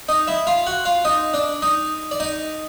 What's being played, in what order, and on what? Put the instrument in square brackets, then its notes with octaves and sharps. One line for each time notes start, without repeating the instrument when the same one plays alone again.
[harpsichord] D#4 D#5
E4 E5
F4 F5
F#4 F#5
F4 F5
D#4 D#5
D4 D5
D#4 D#5
D5
D#4 D#5